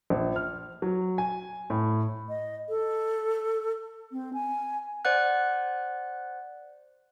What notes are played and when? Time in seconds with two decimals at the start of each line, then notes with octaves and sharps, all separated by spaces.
0.10 A#1
0.36 F6
0.82 F#3
1.18 G#5
1.70 A2
2.29 D#5
2.69 A4
4.12 C4
4.34 G#5
5.05 C5 D5 F#5 F#6